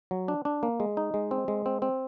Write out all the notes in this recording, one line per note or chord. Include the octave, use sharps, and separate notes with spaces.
F#3
D4
D4
A#3
G#3
D#4
G#3
C4
G#3
C4
C4